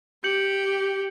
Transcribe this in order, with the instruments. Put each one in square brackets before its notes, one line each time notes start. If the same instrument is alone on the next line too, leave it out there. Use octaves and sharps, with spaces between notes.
[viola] G4 [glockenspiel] G6 C#7 F#7